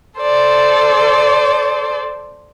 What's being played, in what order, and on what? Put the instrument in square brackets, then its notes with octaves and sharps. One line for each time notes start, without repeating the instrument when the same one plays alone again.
[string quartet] A4 C5 D5